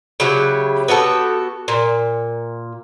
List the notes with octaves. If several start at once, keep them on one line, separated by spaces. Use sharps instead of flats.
C#3 F#3 E4 G4
B3 F#4 G4 A4
A#2